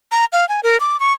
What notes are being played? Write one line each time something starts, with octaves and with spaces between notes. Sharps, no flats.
A#5
F5
G#5
A#4
D6
C#6